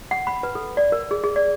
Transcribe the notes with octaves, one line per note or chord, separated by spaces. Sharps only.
F#5
B5
B4
A4
D5
A#4
G#4
G#4
D5